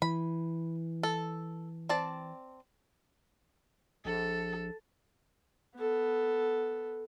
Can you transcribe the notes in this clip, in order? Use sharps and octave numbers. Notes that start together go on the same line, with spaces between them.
E3 B5
A4
C4 D5 A5
A#1 A4
B3 A4